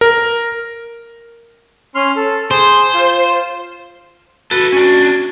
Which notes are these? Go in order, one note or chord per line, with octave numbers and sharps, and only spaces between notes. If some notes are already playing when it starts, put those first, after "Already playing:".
A#4
C#4 C6 F6
A4
G#4 C5
F4
F#4 A4 B4
C#4 D4